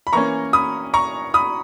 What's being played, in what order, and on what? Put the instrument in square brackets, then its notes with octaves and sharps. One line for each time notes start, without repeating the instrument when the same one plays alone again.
[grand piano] B5
E3 A#3 C#4 A#5 C#6
B5 D#6
A#5 C#6
B5 D#6